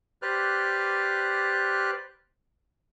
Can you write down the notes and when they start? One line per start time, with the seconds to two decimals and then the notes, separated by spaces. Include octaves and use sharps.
0.22 G4 B4 C5 D5 F6 F#6